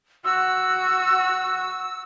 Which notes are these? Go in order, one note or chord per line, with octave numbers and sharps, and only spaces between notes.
F#4 E6